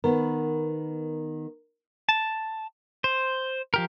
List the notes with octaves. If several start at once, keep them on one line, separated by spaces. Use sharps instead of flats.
D#3 B3 A#4
A5
C5
F3 G4 A#4